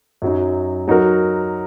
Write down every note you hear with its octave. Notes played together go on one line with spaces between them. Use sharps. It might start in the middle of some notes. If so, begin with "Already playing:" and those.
F#2 F#3 D#4
F#3 D#4 F#4 A#4